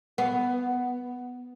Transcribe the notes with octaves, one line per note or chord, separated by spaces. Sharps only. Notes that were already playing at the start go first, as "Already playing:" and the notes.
B3